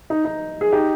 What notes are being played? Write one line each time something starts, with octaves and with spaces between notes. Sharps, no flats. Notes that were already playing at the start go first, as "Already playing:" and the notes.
D#4
D#4
G#4
D#4 G4